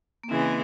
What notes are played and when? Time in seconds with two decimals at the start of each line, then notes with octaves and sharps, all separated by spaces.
0.23 A#3
0.29 C#3 E3 G#3 C4 E4